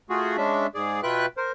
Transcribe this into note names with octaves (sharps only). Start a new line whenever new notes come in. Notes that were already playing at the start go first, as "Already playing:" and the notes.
A3 F4 F#4 G#4
G#3 C#4 D4 E5
G#2 G#4 D5
B2 F4 B4 E5 G5 F#6
A#4 C5